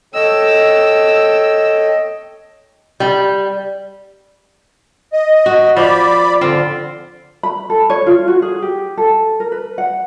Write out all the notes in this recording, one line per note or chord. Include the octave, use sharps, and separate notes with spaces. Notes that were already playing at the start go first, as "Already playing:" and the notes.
A4 C#5 D#5 G5 E6
G3
D#5
F#4
F3 D5 B5
D3 C4 F4
B5
A4
C#5
F4
F#4
G#4
G4
A4
A#4
B4
F#5